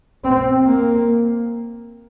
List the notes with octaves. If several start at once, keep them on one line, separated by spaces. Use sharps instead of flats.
C4
A#3